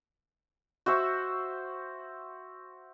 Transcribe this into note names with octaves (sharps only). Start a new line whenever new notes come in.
F#4 C5 E5 C#6